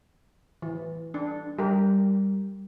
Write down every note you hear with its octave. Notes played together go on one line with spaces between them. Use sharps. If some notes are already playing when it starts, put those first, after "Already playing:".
E3
D4
G3 G4 A#4